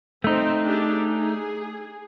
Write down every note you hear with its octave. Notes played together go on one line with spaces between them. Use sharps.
A3 C4 D#4
D4 G4 G#4
G#4